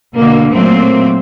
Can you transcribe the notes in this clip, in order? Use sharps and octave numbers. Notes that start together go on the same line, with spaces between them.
B2 D3 A#3
A#2 F#3 A3 A#3 C4